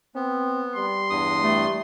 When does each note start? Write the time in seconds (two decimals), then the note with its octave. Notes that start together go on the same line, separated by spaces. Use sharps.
0.15 B3 C4
0.76 G3 C6
1.10 E2 G2 D#6
1.42 G3 A3